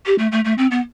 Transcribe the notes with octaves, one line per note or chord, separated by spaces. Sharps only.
G4
A3
A3
A3
C4
B3